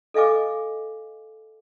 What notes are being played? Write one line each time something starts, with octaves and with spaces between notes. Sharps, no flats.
A4 D#5 F5 G#5 D6